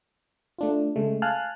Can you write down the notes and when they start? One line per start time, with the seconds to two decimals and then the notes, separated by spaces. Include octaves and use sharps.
0.59 A3 D4 F4
0.96 C#3 G#3 A3
1.22 F5 G#5 A5 F6 F#6